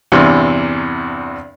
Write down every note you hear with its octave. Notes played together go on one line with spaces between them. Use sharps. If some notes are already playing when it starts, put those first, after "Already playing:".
E2 G2 C3 E3